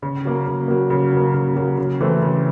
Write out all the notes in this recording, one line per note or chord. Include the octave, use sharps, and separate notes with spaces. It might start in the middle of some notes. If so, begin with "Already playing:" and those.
C#3
F#3 A#3
C#3
F#3 A#3
C#3
F#3 A#3
C#3
F#3 A#3
C#3
E3 A3 C4
C#3